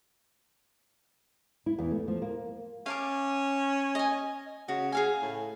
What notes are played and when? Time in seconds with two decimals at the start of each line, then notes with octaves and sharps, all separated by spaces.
1.66 E4
1.79 E2
1.91 A3
2.08 F3
2.22 A#3
2.86 C#4 F5 A5 D6
3.95 D#5 G#5
4.68 C#3 F#4
4.92 G#4 F5 G#5
5.22 A2